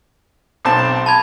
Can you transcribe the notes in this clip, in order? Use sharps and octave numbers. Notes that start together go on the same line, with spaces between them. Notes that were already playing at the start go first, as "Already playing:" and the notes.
B1 C4 A5
A5 B5 G#6